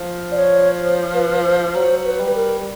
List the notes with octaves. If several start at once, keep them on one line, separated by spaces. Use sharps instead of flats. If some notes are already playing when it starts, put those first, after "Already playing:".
Already playing: F3
D5
C#5
C5
B4
C5
F#3 C5
B4
G3
A#4